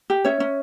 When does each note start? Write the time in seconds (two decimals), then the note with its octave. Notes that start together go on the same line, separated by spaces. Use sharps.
0.10 G4
0.25 C#4 C#5 E5
0.40 C#4